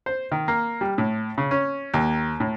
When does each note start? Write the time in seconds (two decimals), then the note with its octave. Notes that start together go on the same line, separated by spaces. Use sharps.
0.06 C5
0.32 D#3
0.48 A#3
0.81 G3
0.98 A2
1.38 C#3
1.51 C#4
1.94 D#2
2.40 A2